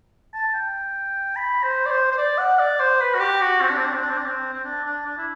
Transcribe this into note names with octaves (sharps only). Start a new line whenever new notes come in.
A5
A5
G5
B5
C5
D5
C5
C5
D5
F#5
D5
C5
B4
F#4
G4
F#4
C4
D4
C4
D4
C4
D4
C4
D4
C4
C4
D4
D4
D4
E4